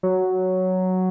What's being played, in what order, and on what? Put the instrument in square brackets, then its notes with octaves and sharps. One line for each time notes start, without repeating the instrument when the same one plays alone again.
[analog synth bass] F#3